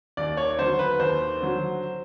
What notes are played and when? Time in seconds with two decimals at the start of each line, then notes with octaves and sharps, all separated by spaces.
0.17 D#2 D5
0.37 C#5
0.58 D3 F#3 C5
0.79 B4
0.99 D#2 C5
1.41 D3 F#3